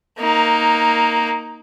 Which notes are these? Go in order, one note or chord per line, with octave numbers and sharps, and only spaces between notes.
A#3 D#4